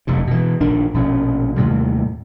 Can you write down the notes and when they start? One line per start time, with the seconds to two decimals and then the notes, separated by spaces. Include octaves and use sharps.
0.07 F1 F#2 C3
0.27 B2 E3
0.60 A#1 D#3 D4
0.94 A#1 B2 C#4
1.56 D#2 A2 C3 G3